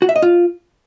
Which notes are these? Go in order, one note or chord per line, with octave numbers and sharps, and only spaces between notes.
F#4
E5
D#5
F4